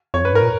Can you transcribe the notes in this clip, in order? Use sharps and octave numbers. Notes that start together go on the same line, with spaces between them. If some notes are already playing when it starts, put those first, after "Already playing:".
F2 C#5
F#2 B4
G#2
A#4
A#2